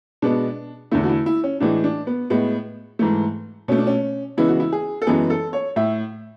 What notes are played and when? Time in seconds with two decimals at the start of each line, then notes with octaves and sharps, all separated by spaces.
0.22 B2 G#3 B3 D4
0.91 E2 D3 A3 E4
1.04 F#4
1.09 E4
1.26 E4
1.44 C#4
1.60 A2 E3 G#3 D4
1.84 D4
2.07 B3
2.30 A2 G#3 B3
2.99 G#2 E3 A3
3.68 B2 A3 C#4
3.78 D4
3.87 C#4
4.37 C#3 E3 G#3 B3 E4
4.48 F#4
4.60 E4
4.72 G#4
5.02 A4
5.07 F#2 E3 G#3 B3 G#4
5.30 A4
5.53 C#5
5.76 A2 E5